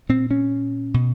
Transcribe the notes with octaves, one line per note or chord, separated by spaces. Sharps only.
A#2 C4
C#4
B2